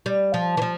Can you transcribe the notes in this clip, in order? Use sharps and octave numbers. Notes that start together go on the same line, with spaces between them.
G3
F3
E3
F3